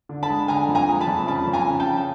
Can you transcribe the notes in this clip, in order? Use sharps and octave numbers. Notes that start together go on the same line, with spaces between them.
D3
A5 B5
G#3
D3 G#5 A#5
F2
G#5 A#5
G#3
A5 B5
F2
C#3 A5 B5
F2
G#5 A#5
C#3
G5 A5
C#3